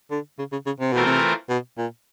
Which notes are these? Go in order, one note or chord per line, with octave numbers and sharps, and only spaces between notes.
D3
C#3
C#3
C#3
C3
B2 E3 A3 C4 F4 A#4
C3
B2
A#2